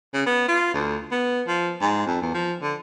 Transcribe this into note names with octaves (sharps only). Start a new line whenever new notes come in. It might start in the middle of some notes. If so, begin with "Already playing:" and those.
C#3
B3
F4
D2
B3
F3
G#2
F2
E2
F3
D3